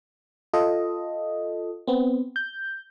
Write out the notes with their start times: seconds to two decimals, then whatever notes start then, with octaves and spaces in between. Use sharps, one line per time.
0.53 F4 A4 D#5
1.87 B3 C4
2.36 G6